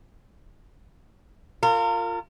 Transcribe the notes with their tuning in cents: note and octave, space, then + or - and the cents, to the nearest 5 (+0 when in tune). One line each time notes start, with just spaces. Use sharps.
F4 +0 A#4 -35